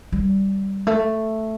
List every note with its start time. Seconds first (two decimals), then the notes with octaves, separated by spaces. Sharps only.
0.12 G3
0.87 A3